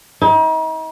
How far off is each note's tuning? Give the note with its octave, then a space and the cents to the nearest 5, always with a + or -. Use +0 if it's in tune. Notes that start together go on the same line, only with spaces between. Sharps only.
D#4 +40